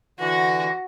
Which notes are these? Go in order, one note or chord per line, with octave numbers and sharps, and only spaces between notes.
D3 E3 F#4 A#6